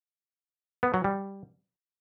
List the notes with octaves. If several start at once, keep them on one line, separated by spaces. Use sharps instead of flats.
B3
F#3
G3